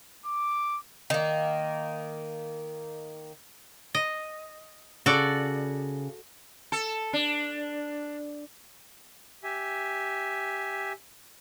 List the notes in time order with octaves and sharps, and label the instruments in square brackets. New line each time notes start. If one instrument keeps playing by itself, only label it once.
[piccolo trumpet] D6
[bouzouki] D#3 A#3
[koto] D#5
[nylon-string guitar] C#3 [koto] F#4 A4 D5
[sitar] A4
D4
[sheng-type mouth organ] G4 E5 G#5